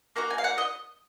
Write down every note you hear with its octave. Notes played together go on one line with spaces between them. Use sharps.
A#3 D#4 F#4 A#5
G#5
F5
F#5
D#5